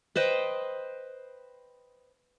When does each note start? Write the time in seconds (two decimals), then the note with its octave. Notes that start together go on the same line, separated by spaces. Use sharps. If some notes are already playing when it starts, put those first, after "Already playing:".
0.16 B4 C5 D#5 G5